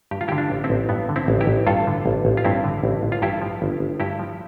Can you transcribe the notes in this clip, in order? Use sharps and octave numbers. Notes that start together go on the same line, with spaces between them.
G2 G4
F4
E4 G4
D3
D4 F4
A1
C4 E4
A1
G2 B3
D3
C4 E4
A1
E4 G4
A1
G2 F4 A4
D3
A1
A1
F4
G2 C4 E4
D3
A1
A1
F4
G2 E4 G4
F3
G1
G1
G2 E4 G4
F3